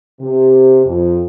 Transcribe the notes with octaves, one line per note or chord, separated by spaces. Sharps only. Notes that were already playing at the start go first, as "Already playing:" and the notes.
C3
F2